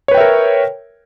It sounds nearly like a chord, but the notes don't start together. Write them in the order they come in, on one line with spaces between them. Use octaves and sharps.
C#5 B4 G5 E5 A#4